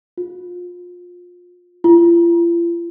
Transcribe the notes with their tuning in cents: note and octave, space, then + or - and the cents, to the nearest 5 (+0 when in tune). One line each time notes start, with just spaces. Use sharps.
F4 +25
F4 -45